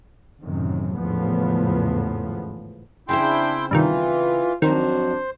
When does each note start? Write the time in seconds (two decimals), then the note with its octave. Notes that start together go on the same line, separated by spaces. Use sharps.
0.42 A1 F#2 C3 D#3
0.96 G#1 E2 A2 C#3 F3 B3
3.09 C#3 C4 D4 E4 C5 G5 C6
3.71 G2 C3 D#3 E3 F4
4.62 F2 D#3 F#3 D4 F#4 C5